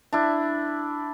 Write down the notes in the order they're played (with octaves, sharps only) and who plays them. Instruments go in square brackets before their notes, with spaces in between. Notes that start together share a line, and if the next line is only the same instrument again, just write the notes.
[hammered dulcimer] D4 E4